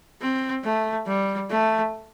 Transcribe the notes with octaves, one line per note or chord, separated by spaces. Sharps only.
C4
A3
G3
A3